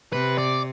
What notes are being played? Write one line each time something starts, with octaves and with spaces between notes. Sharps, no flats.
C3 B4
D5